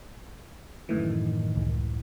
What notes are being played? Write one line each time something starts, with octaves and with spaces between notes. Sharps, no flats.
F#2 A2 D#3 E3
C#2